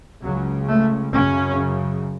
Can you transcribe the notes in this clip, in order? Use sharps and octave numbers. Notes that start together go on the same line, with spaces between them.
C#2 C#3 F#3
A3
F#2 C#3 C#4